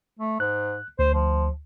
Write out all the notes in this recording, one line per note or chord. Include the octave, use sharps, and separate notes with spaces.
A3
G#2 F#6
D2 C5
F3